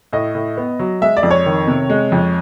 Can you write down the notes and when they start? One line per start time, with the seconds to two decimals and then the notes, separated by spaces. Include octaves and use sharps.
0.13 A2 D#5
0.35 A2
0.57 B3
0.79 F#3
1.02 G#3 E5
1.17 D5
1.23 F2
1.31 C#5
1.46 D#3
1.67 C3
1.90 G#3
2.12 F2